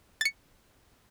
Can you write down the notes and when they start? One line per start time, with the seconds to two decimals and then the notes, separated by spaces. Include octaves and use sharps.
0.21 A6 C#7